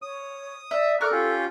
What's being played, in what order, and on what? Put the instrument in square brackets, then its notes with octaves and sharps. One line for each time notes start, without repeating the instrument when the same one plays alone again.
[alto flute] C#5 [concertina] D#6
[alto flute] D5 [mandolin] E5
[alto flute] A4 [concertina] A#4 D5 [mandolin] C#6 F6 F#6
[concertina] C#4 F4 G4